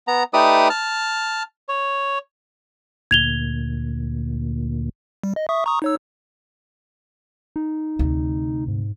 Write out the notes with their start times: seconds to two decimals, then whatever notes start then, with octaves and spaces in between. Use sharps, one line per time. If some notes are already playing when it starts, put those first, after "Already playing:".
0.08 B3 A#5
0.33 A3 D#4 G4 B4 D5 D#6
0.70 A5 F6
1.69 C#5
3.11 D2 A#2 G#6 F7 G7
5.24 G3
5.36 D#5
5.49 E5 C#6 D#6
5.66 A#5 C#6 D#6
5.82 D#4 C#5 E6
7.56 D#4
7.99 D2 C3
8.68 G#2